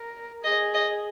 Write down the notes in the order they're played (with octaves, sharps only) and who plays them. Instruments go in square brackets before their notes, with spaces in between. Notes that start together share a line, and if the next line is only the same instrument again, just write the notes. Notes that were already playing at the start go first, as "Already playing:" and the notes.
Already playing: [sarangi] A#4
[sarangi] G#4 [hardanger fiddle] D#5
[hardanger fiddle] D#5